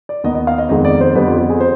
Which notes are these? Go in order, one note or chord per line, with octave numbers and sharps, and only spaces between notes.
D5
D#2 D#3 B3 D#5
D#5
F5
D#5
F2 D#3 G#3 B3 D#5
D5
C5
F2 D3 G3 B3 B4
F4
G4
G#4
C5